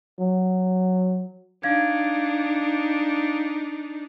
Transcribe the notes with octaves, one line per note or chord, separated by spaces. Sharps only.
F#3
D4 D#4 F5 G#6